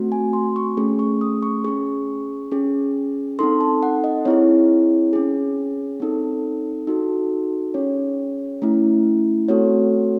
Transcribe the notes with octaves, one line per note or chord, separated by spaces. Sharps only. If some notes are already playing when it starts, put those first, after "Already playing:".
Already playing: A3 C4 F#4
G#5
C6
C#6
A3 C#4 G#4
C#6
D#6
C#6
C#4 G#4 C#6
C#4 G#4
C4 D#4 A4 C6
A5
F#5
D#5
C4 E4 G#4 C#5
C#4 G#4
C4 D#4 A4
D#4 F#4 A4
C#4 G#4 C#5
A3 C#4 E4
A3 C4 F#4 A4 C#5